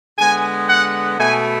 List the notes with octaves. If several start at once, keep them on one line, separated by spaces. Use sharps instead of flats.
D3 G#3 B3 G#5
F#5
B2 A3 G#5